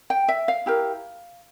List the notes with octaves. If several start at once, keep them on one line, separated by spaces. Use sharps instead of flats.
G5
E5
F5
E4 G4 A#4